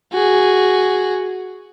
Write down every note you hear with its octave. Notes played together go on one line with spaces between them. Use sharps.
F#4 G#4